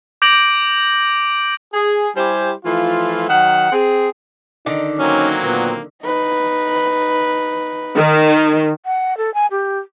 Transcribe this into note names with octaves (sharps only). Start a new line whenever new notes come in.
D6 G6 A#6 D7 F#7
G#4
G3 E4 G4 C5 G#5
E3 F3 A3 F4
D#3 F#3 F#5
C4 G#4
D3 D#3 D#4 D5
F#3 A#3 C4 C#4
A#2 B3
D#4 B4
D#3
F#5
A4
G#5
G4